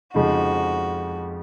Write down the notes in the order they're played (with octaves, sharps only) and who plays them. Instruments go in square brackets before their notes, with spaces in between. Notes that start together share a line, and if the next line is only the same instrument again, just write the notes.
[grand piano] F2 C#3 F3 G#3 D#4 [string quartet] F#4